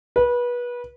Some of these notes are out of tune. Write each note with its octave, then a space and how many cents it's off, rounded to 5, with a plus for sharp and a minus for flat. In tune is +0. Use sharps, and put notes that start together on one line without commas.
B4 -25